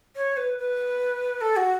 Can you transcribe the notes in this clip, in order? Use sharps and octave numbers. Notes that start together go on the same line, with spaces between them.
C#5
B4
B4
A4
F#4